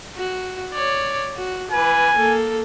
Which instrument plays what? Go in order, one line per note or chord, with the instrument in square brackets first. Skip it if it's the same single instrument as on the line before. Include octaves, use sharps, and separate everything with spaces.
[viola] F#4
C#5 D5
F#4
[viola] E3 B4 [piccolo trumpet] G#5
[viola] A#3 A4